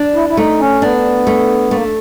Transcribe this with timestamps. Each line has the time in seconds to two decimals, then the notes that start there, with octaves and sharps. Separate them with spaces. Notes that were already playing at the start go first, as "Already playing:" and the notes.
Already playing: D4
0.15 E4
0.29 E4
0.37 A3 D#4
0.60 C#4
0.82 B3 D4
1.27 A3
1.71 A3 A#3